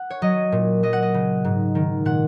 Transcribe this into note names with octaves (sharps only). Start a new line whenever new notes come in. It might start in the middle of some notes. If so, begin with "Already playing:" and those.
Already playing: F#5
C#5
F#3 D#5
A#2
F#3 D#5
F#5
D#5
C#3
G#2
D#3
A#2 F#5